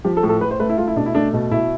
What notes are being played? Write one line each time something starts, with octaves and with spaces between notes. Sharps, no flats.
F3 G4
A4
A2
A4
A2 B4
C5
A3 B4
E4
A3 F4
E4
B2 D4
E4
A3 D4
B2
B2 E4